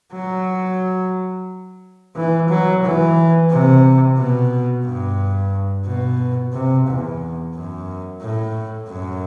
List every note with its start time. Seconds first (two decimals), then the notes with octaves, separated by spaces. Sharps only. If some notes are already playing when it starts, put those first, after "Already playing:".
0.13 F#3
2.16 E3
2.49 F#3
2.83 E3
3.50 C3
4.17 B2
4.85 G2
5.86 B2
6.53 C3
6.88 E2
7.55 F#2
8.21 A2
8.89 F#2